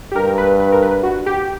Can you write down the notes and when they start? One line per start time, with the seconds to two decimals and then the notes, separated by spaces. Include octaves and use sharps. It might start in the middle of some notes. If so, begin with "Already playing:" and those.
0.12 G4
0.16 G2 A#4
0.38 B4
0.60 B4
0.72 A#4
0.82 B4
1.03 F#4
1.26 G4